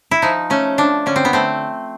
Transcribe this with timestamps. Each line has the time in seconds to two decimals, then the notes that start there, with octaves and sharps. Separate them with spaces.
0.11 E4
0.22 F3 D#4
0.50 A3 C#4
0.78 F3 D4
1.06 D3 C#4
1.16 C4
1.25 B3
1.33 A3 C4